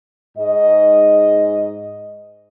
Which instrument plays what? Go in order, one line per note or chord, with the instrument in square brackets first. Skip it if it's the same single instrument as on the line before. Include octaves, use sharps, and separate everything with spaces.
[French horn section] G#2 D#5